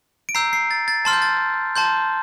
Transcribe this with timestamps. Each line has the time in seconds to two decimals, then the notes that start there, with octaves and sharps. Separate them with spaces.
0.29 D7
0.35 A#5 E6 G6 C7
0.53 C7
0.71 A6
0.88 A6
1.05 A5 C6 F6 A6
1.13 G6
1.22 A6
1.76 A5 C6 G6